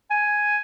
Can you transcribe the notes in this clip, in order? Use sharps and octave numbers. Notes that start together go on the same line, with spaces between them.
G#5